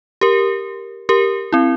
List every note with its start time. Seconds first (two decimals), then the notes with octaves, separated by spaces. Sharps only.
0.21 G4 A#4
1.09 G4 A#4
1.52 C4 E4